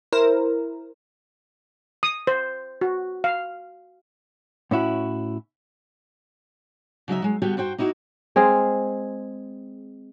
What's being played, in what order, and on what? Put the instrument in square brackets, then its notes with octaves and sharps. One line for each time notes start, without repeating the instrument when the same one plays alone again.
[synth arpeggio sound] E4 A#4 C5
[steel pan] D#6
C5
F#4
F5
[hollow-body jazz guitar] A2 C#4 E4 F#4
[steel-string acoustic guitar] C#3 F#3 D#4 E5
F#3 G#3
D3 G3 B3 F#4 G4 G5
G2 F#4 C5 G5
A#3 D#4 E4 F#4
[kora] G#3 C4 G#4 F5